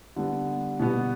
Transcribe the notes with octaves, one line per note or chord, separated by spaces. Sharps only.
D3 G3 B3
B2 G3 B3